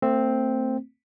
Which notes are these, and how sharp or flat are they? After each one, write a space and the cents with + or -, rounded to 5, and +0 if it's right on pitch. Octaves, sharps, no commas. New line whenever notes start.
A3 +40 C4 +0